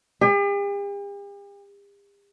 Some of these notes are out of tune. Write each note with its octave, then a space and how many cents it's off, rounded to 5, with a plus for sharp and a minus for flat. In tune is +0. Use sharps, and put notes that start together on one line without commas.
G4 +45